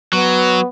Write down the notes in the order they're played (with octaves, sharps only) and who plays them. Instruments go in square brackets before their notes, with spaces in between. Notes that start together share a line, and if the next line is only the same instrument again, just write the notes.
[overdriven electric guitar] F#3 [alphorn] B3